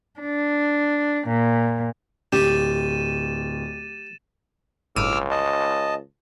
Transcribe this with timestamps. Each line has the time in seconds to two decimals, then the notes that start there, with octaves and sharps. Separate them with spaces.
0.20 D4
1.28 A#2
2.32 D1 G4 A6 D#7 E7
4.96 G1 C#2 A2 D6 E6 F6 D#7
5.31 D#5 A5